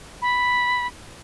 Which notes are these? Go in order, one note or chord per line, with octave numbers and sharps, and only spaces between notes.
B5